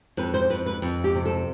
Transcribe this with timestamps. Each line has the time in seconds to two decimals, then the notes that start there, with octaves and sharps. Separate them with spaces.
0.17 F2 B4
0.34 C5
0.50 F2 B4
0.66 B4
0.82 F2
1.04 G4
1.15 C3
1.26 A4